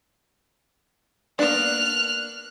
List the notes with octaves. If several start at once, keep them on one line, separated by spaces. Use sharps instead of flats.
A#3 B3 D4 F6 F#6